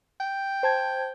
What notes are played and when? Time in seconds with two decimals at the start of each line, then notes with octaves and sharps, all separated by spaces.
0.20 G5
0.63 C5 A5 G#6